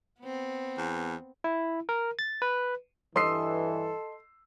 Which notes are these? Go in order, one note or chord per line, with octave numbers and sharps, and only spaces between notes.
B3 C4
E2
E4
A#4
A6
B4
G2 E3 A4 D#5 C6 E6 C7